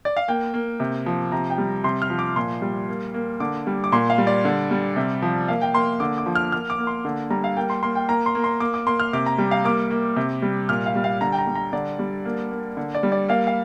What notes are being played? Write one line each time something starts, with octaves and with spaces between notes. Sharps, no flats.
D5
F5
A#3 G5
A#3
C3
F3
C3 A#5
G5
G3
C3 C6
F6
F3
D6
A#2 C6
G3
A#3
A#3
D3 D6
G3
D6
A#2 C6
F5
G3
D5
D3
G3
C3
F3
A#3 F5
G5
A#3 C6
D3 D6
D6
F3
F6
A#3 F6
D6
A#3
C6
D3
G3 A#5
F5
A#3 G5
C6
A#3 C6
G5
A#3 A#5
C6
A#3
C6
A#3 D6
D6
A#3 C6
F6
C3 D6
A#5
G3
F5
A#3 D6
A#3
C3
G3
A#2 F6
F5
G3
F5
D3 A#5
G5
A#5
G3
A#5
D3 D5
G3
A#3
A#3
D3
D5
G3
D5
A#3 F5
F5